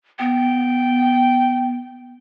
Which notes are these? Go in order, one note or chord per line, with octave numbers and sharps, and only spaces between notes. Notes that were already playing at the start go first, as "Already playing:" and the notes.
B3 G5